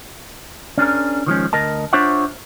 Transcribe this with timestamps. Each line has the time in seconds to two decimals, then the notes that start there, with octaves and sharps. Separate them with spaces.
0.78 C#4 D4 G#4 A#4
1.26 D#3 F3 G#3 C#4
1.53 D2 A#4 D#5 A5
1.93 D4 F4 C5 C#5 E5 F#5